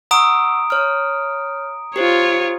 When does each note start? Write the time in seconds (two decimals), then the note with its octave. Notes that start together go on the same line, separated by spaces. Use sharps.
0.11 F#5 A#5 C#6 D#6 E6 D7
0.70 C#5 F6
1.96 F4 G4 C5 C#5